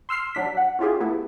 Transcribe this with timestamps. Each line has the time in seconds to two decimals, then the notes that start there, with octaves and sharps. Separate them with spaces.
0.09 C6 E6 F6 C7
0.35 F#3 D4 B6
0.57 F#5
0.79 C#4 E4 F4 G4 G#4
1.00 A3 B3 E4